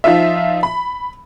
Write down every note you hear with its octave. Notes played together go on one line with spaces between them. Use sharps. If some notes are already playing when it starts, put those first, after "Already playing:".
F3 D#4 F4 E5
B5